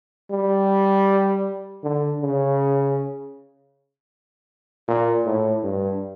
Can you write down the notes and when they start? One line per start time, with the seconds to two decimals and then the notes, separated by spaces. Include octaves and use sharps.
0.31 G3
1.83 D3
2.21 C#3
4.88 A#2
5.25 A2
5.64 G2